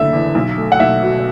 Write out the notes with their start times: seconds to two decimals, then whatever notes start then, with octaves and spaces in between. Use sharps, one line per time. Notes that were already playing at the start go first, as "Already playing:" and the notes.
Already playing: F#1 D3 A3 E5
0.13 E2
0.35 B1
0.58 A3
0.72 F#5
0.80 B1 E5
1.03 B2